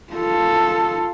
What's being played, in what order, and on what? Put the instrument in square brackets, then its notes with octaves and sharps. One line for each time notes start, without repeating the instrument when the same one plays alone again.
[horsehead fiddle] F4 A4